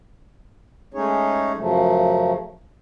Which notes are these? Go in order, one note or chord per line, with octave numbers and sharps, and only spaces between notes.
G#3 A3 C#4 D#4 G#4 C#5
F#2 C#3 F3 F#3 A3